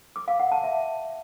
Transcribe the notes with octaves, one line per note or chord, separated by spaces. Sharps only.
D6
F5
F#5
A5
E5